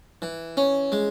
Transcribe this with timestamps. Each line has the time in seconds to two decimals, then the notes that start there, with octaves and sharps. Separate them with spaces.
0.22 E3
0.57 C#4
0.92 G#3